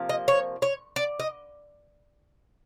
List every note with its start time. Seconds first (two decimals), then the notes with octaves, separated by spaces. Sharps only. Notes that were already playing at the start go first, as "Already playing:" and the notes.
Already playing: C3 F3 A#3
0.09 D#5
0.28 C#5
0.62 C#5
0.96 D5
1.20 D#5